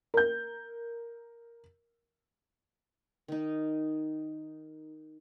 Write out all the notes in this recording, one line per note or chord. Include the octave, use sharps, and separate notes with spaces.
A#4 G6
D#3 D#4